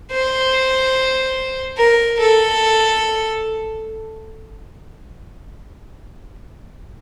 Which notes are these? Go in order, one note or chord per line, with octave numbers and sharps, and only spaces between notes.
C5
A#4
A4